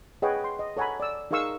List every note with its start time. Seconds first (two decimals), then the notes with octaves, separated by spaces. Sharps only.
0.22 G#4 B4 C#5 D#5 F#5 G5
0.44 C6
0.59 D#5
0.77 A4 C#5 F#5 G#5 A#5 B5
1.00 D5 E6
1.31 D#4 G#4 A#4 F5 C#6 E6